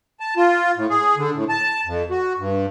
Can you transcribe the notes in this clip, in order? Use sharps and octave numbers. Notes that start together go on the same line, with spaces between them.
A5
F4
A2
G#4
D3
A2
A5
F2
F#4
G2